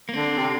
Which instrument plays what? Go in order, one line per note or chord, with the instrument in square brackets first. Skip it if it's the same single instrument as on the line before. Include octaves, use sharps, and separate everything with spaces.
[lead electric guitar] A#3
[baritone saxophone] D3 [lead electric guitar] C4
[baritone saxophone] C3